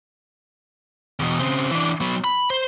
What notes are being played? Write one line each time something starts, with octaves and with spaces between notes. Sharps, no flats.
E2 B2
C#3 C4
E3 D4
F#3 B3
B5
C5